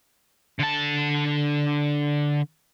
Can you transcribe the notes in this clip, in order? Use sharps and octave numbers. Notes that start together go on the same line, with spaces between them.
D3 A5